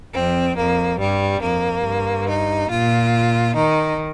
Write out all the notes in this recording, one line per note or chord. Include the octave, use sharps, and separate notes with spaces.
F2 C4
F2 A#3
G2 G3
F2 A#3
G2
D#4
A#2 F4
D#3 D#4